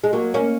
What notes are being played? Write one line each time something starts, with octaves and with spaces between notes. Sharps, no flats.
G#3
F#3 A#3
A#3 C#4